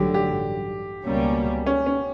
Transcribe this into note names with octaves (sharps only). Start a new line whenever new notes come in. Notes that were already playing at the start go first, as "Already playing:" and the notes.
Already playing: A1 G2 D3 F#3 G4
G4
C#2 B2 G3 A#3 C#4
C#4
C#4